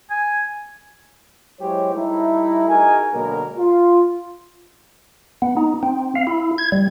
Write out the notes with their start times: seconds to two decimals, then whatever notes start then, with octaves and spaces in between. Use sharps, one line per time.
0.10 G#5
1.60 F#3 G#3 E4 G4 C5 C#5
1.94 G3 A3 D#4 E4
2.68 D#4 F#4 G#4 A#4 G#5
3.12 B2 D3 F#3 G#3 A#3 A#4
3.57 F4
5.42 B3
5.57 D#4
5.83 C4
6.15 F5
6.27 E4
6.58 G#6
6.72 G3